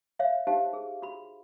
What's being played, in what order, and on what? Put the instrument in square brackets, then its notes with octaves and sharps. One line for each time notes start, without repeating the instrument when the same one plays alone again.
[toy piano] C#5 E5 F5
D#4 G4 C5 F5 A5
G#4
F#4 B5